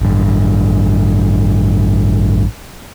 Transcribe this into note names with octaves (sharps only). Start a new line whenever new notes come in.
A1 G2